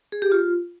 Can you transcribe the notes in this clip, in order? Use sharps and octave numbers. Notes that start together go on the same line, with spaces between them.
G#4
G4
F4